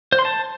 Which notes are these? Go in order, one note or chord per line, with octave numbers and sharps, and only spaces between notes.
C5
C6
A5